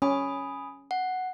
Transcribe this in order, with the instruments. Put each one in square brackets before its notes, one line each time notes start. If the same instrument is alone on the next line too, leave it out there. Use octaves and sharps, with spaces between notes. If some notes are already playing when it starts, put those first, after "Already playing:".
[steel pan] C#4 [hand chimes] G#5 B5 D#6
[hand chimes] F#5